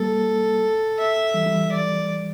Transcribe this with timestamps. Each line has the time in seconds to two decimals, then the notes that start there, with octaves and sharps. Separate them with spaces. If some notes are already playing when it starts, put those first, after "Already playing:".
Already playing: G3 A#3 A4
0.99 E5
1.34 E3 G3
1.46 E3 G3
1.72 D5